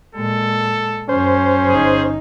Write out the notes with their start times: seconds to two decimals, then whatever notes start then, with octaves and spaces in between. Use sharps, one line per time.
0.15 A#2 G#3 A4
1.09 F#2 C#4 C5
1.69 G1 D#4 G#4